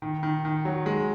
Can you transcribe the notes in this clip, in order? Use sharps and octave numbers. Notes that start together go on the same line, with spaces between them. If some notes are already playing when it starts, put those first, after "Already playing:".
D#3
D#3
D#3
F#3
G#3